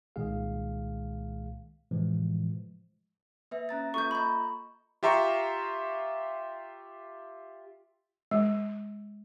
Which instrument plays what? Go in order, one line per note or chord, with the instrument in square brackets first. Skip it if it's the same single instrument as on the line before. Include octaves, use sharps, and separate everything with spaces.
[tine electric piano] C2 A#2 D#3 G#3 G#4 F5
A2 C3 E3 F3 G#3
[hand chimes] A#3 B4 E5
C#4 A#5 A6
[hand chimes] A#3 F4 A4 [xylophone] C#6 G6
[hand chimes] D#5 A#5 C#6 [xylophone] B5 G6
[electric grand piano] F4 G4 E5 A#5 C6 C#6
[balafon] G#3